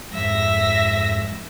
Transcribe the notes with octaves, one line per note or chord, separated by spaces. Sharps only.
F2 G#2 E5 A#6